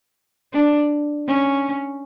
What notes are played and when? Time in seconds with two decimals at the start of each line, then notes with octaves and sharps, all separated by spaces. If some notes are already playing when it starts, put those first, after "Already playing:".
0.53 D4
1.27 C#4